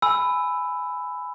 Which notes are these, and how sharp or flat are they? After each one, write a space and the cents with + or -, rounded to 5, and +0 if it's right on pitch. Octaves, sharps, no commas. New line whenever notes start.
G#5 +5 B5 +10 E6 +0